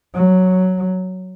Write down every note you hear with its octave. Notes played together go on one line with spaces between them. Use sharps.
F#3